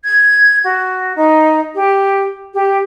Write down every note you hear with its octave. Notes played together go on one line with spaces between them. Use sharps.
G#6
F#4
D#4
G4
G4